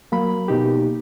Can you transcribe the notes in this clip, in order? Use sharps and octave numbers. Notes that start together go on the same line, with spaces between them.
F#3 A#3 B5
B2 D#4 G4